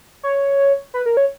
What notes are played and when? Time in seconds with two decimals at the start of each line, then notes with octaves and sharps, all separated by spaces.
0.23 C#5
0.94 B4
1.06 A#4
1.17 C#5